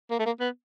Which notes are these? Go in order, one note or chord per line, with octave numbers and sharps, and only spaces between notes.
A#3
A3
A#3
B3